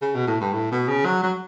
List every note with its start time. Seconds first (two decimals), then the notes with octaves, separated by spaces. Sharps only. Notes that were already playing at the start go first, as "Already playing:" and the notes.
0.01 C#3
0.15 B2
0.27 A2
0.41 G2
0.53 A2
0.72 B2
0.88 C#3
1.06 F#3
1.23 F#3